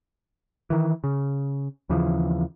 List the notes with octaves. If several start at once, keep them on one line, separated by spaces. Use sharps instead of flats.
D#3 E3
C#3
D#2 C#3 E3 F3